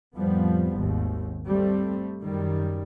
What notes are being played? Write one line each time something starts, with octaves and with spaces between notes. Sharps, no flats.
F2 A2 F3 G3 B3
G#1 D#2 G#2
G3 A3 C4
F#2 D#3 G3